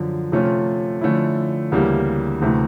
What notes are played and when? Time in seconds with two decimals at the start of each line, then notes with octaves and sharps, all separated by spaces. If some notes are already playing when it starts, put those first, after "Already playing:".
Already playing: F#2 D3 F3
0.32 C3 F3 A3 C#4 F4
1.01 D3 F3 A3 C#4 E4
1.72 D2 C#3 E3 G3 A#3
2.41 D2 C3 E3 A3